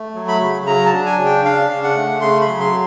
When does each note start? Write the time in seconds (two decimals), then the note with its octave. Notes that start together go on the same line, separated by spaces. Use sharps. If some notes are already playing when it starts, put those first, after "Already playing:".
Already playing: A3
0.15 F#3
0.28 B5
0.41 C#3
0.67 F#3 A#5
0.86 A5
0.93 D4
1.06 G#5
1.18 C#3
1.26 G5
1.45 D4 F5
1.70 C#3
1.83 F#5
1.95 A3
2.21 C#3 C6
2.41 B5
2.47 F#3
2.60 C6